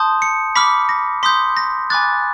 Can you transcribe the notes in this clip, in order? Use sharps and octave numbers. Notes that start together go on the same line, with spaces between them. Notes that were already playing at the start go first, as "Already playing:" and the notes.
Already playing: A5 C6 D#6 G6
C#7
B5 D6 F6 B6
A#6
C6 D#6 G6 B6
A#6
G#5 B5 D6 F#6 A6